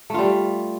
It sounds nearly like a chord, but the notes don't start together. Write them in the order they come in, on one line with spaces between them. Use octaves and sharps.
A3 F4 G3